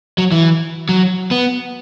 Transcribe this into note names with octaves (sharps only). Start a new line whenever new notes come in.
F#3
E3
F#3
B3